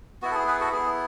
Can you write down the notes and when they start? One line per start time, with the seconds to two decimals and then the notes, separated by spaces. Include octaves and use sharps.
0.22 B3 E4 F#4
0.31 A4
0.35 G#4
0.48 G#4 B4
0.60 F#4 A4
0.72 B3 E4 G#4